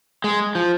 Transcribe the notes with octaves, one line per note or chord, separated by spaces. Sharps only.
G#3
F3